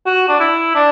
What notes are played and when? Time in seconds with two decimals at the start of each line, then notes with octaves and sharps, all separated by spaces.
0.06 F#4
0.28 D4
0.40 E4
0.75 D4